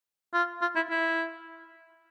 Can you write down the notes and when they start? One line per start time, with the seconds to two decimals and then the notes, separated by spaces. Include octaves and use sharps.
0.34 F4
0.62 F4
0.76 E4
0.90 E4